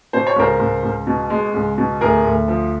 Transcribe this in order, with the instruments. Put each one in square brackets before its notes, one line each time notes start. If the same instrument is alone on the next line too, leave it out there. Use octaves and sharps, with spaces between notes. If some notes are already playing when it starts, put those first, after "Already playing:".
[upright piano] B2 C5
C#5
C#2 A#4 C5
C#2
C#2
B2
G#3
C#2
B2
D2 G#4 A#4
D2
F3